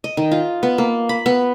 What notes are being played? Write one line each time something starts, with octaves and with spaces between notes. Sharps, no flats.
D#5
D#3
F4
B3
A#3
B5
B3